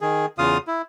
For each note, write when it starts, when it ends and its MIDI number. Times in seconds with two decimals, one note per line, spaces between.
0.01 0.26 51
0.01 0.26 68
0.38 0.58 40
0.38 0.58 49
0.38 0.58 65
0.38 0.58 77
0.38 0.58 87
0.67 0.82 64